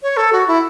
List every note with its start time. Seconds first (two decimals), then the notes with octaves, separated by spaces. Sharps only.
0.03 C#5
0.17 A4
0.33 F#4
0.47 E4